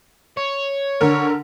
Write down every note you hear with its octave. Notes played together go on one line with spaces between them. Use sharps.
C#5
D3 A#4